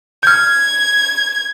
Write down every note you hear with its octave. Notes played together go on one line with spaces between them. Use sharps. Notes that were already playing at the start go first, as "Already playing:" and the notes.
F6 G6 G#6